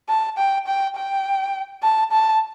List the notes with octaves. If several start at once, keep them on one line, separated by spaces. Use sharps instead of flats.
A5
G5
G5
G5
A5
A5